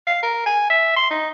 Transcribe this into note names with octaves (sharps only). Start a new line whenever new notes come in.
F5
A#4
G#5
E5
C6
D#4